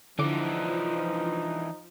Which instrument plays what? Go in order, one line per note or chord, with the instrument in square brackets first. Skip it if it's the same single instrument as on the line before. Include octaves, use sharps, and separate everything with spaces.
[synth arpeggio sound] D3 D6 [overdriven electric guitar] E3 D4 [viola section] F3 [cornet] D#4